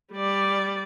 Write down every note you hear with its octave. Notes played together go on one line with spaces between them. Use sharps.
G3 D5